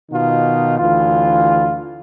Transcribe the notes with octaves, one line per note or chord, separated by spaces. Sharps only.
B2 D#3 D#4 F4
D2 E3 F4